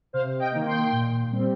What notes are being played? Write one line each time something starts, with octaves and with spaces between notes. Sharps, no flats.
C3 C5 F5
D#5 G5
D#3 A#3
G5 C6
A#2
G3 C4